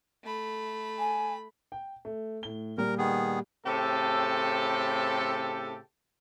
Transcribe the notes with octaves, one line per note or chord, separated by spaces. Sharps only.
A3 B5
G#5
G5
A3
A2 G7
A#2 G3 A#4
D#3 B3 G#4
A2 C#3 C4 G4 A4